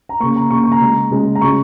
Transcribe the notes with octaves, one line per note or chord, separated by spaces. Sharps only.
A#5
C#3 A#3 C#6
A#5
C#3 A#3 C#6
C#6
A#5
C#3 G#3
C#3 G#3
A#5
C#3 G#3 C#6